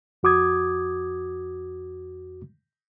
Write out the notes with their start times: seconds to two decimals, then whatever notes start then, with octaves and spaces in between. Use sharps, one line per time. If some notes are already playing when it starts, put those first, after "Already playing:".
0.23 F2 F#4 D6 D#6 G#6